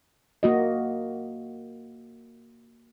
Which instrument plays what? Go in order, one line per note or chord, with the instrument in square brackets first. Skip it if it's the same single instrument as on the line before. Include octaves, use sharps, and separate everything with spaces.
[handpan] A#3 F#4 D#5